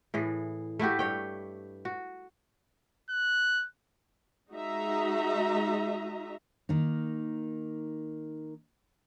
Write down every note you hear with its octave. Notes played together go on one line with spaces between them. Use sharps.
A2 E3 G#4
A3 E4 F#4 G4
G2 C#5 G5
F#4
F#6
G#3 D#4 F#4 D#5 E5 A#5
D#3 A#3 D#4